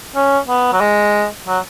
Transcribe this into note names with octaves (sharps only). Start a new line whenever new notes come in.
C#4
B3
F#3
G#3
F#3